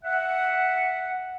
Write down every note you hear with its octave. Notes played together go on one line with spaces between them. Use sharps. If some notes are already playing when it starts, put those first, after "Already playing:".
E5 F#5